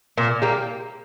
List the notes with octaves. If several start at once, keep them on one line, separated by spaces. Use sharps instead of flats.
A#2
G3 A#3